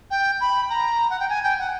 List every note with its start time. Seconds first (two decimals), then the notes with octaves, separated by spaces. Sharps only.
0.11 G5
0.41 B5
0.70 A#5
1.10 F#5
1.20 G5
1.30 G#5
1.44 G5
1.59 F#5